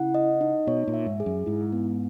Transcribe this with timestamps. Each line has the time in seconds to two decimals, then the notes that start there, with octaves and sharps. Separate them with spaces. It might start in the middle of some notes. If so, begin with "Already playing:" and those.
Already playing: C#3 E4 F#5
0.14 D#5
0.41 D#4
0.67 B2 C#5
0.87 A#2
0.94 E5
1.06 G#2
1.20 G#4
1.26 F#2
1.46 G#2 E4
1.72 B3